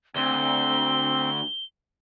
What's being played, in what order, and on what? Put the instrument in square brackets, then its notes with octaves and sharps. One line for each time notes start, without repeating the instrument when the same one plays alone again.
[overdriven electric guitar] D2 [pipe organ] C4 [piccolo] G7